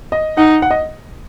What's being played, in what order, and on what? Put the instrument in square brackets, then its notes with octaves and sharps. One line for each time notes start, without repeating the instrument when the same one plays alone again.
[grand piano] D#5
[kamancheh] D#4 [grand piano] F#5
[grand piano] F#5
D#5